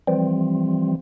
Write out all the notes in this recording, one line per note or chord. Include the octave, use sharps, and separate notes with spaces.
E3 F3 G3 C4